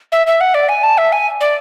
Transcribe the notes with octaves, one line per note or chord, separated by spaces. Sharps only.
E5
E5
F#5
D5
G#5
A5
E5
G#5
D5